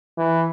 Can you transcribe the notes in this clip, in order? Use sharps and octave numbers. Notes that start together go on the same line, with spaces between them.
E3